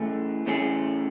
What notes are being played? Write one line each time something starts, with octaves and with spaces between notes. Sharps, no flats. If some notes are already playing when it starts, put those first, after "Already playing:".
Already playing: A2 E3 A3 C#4 G#4
A2 E3 A3 C#4 G#4